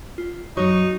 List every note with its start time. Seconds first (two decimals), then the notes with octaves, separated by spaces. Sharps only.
0.18 F4
0.57 F#2 F#3 D#4 F#4 C#5 C#6